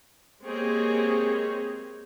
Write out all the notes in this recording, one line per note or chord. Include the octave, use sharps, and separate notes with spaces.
G#3 A#3 C4 G4 G#4 C#5